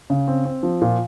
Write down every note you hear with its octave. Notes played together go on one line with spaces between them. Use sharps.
C#3
C4
C4
F3
A#2